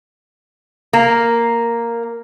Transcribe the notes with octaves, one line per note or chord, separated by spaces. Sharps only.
A#3